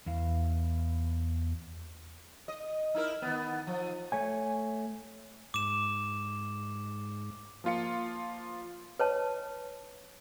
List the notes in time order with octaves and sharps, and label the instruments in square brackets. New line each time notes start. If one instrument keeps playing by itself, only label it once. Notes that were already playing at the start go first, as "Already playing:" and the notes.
[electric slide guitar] E2 F5
[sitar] D#5
D#4 E4 A#4
D#3 B3
F3
[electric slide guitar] A3 C#5 G#5
[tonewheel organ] G#2 [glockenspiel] D6 E7
[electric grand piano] F3 A#3 F4 F5 C#7
[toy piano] B4 C#5 A5